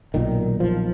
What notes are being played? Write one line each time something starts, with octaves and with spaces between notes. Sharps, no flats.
B1 A#2 D#3
F3